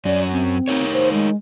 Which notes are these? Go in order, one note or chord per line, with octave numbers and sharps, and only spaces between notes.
F#2 C#4 D5
C4
D#4 A#4 C#5
C5
G#3